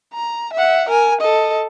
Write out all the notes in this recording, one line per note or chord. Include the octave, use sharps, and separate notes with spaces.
A#5
E5 F#5
A#4 G#5
A4 D#5